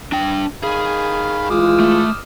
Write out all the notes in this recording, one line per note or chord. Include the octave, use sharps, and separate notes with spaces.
D4 G5
D#3 G#4 F5 B5
E3 G#3 F4 D6 D#6 F6
A3